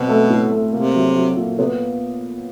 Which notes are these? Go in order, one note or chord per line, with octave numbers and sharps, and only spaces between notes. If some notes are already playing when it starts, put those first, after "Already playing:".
Already playing: B2 F#3 C4
A3
A2
A3
C3 A#3
F#3
F#3
A#2
C3 B3